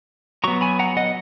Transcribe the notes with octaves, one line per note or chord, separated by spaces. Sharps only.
F#3 B3 A#5 C#6
G#5 B5
F#5 A#5
D#5 F#5